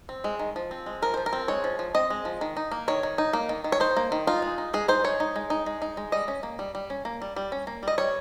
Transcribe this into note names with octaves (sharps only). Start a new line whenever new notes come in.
C4
G#3
D#3
F3
C4
G#3
F3 A#4
F3 C5
A#4
C4
G#3 C#5
F3
F3
C4 D#5
G#3
F3
D#3
D#4
A#3
D#3 C#5
D#3
D#4
A#3
D#3
D#3
C#5
D#4 C5
A#3
D#3
D#4 F4
G#3
D#4
G#3 G#4
D#4 C5
G#3 C#5
D#4
G#3
D#4
G#3
D#4
G#3
G3 D#5
C#4
A#3
G3
G3
C#4
A#3
G3
G3
C#4
A#3
G3 D#5
G3 C#5